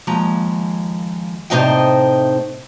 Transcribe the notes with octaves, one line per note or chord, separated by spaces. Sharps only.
D#2 F3 G#3 A#5
A2 C3 D#4 C5 D#5 G5